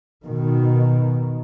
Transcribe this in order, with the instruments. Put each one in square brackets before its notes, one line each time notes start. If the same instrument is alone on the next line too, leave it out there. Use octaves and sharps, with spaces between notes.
[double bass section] B2 D#3